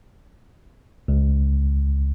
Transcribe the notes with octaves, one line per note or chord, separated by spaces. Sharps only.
C#2